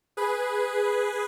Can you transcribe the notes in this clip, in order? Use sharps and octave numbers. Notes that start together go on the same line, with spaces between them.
G#4 B4